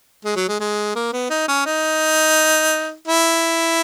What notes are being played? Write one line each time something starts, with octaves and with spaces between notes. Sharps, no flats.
G#3
F#3
G#3
G#3
A#3
B3
D#4
C#4
D#4
E4